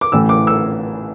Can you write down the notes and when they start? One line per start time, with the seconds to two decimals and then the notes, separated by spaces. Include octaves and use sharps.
0.01 D6
0.12 A1 A2 E3 E6
0.29 D6
0.47 E6